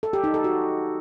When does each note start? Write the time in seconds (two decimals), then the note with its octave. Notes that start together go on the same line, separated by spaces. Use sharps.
0.03 A4
0.13 G4
0.24 D#4
0.34 A4
0.44 F#4